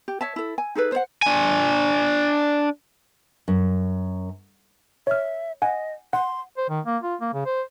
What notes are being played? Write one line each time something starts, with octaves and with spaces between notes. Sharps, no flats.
G4
C#5 E5 A5
E4 A4
G#5
D#4 G#4 A4 B4
C5 C#5 F#5
D4 G#5
F#2
C#5 E5 F6
D#5 F#5 G#5
F#5 C6
C5
D#3
A#3
F4
A#3
C#3
C5